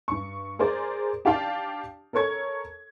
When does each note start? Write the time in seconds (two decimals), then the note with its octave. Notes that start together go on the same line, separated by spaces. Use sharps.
0.08 G2 C#6
0.59 G#4 A#4 C5 D5
1.25 D4 G4 D5 F5 G5 A5
2.13 A4 A#4 C#5 C#6 G#6